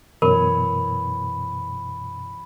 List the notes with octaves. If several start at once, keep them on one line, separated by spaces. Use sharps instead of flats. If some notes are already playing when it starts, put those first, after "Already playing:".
F#2 B2 E3 A#4 C#5 B5